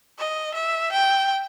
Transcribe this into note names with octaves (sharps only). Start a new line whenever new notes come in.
D#5
E5
G5